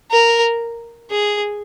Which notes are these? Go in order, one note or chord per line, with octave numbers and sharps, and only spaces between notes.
A#4
G#4